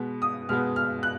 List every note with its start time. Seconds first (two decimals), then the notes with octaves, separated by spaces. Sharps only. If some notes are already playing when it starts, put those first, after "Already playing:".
Already playing: B2 G#3 B3
0.22 D#6
0.49 B2 G#3 B3 F6
0.76 F6
1.03 F#6